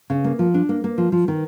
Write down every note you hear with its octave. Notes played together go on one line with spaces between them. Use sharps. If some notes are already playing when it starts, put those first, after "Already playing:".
C#3
A#3
F3
D4
A#3
A#3
F3
F3
D#3